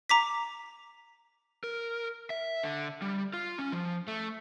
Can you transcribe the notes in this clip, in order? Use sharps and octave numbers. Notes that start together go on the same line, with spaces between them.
A#5 D6 B6
A#4
E5
D3
G3
F4
C#4
F3
A3